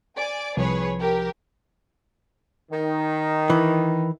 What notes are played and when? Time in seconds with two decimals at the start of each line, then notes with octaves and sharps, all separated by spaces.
0.18 D5 G#5 D7
0.57 C2 F3 G#4 B4 C#5
0.99 G4 A#4
2.72 D#3
3.50 E3